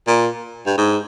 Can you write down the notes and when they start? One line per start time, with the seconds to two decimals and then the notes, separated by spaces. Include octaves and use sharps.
0.07 A#2
0.66 G2
0.77 G#2